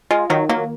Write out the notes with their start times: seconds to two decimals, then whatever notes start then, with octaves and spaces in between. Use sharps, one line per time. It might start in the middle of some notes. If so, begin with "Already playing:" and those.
0.11 G#3 F4
0.30 D#3 F#3
0.49 F#3 A#3